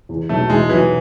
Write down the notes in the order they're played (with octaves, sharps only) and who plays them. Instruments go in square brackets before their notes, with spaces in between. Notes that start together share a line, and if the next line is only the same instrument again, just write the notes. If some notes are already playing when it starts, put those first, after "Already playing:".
[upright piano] E2
[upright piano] B2 F#3 [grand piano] A3
[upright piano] E2 [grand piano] G#3
[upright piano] B2 F#3 [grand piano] E3